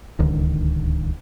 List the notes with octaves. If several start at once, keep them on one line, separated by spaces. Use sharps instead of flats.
D1 C#2 D3 D#3